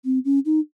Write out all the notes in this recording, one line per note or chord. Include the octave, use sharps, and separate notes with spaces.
C4
C#4
D#4